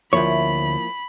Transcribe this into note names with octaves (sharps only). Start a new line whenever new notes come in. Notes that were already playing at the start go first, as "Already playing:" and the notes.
D2 F3 A#3 E4 C#5 B5